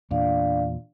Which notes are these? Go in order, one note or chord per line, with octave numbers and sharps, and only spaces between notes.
E2 A#2 D4 D5 F5